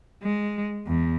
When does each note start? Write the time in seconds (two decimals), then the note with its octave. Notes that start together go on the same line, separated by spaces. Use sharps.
0.23 G#3
0.87 E2